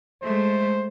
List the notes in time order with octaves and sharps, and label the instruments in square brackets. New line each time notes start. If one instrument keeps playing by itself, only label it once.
[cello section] G#3 A3 [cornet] C5